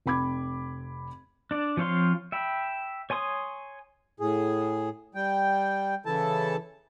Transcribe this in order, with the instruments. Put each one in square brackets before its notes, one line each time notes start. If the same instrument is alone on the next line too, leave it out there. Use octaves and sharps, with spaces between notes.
[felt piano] F1 C4 B5 D6 G#6
[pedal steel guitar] D4 D5
F3 C4 C#5 F5 C6
E5 G5 B5
C#5 G#5 C6 D#6
[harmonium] A2 G#4
G3 G5
C#3 E3 E4 A4 A5